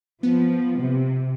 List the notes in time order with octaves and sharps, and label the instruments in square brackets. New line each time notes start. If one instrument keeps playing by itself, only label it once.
[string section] F3 [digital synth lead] B3
[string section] C3